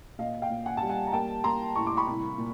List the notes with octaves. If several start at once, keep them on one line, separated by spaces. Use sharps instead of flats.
A#2 D#5 F5
F5 G5
A#2
F#5 G#5
G3 A5
F#5 G#5
A#5
A#3 G5 A5
A#3 A#5 C6
A2 C#6
D6
B5 C#6
C2
A#2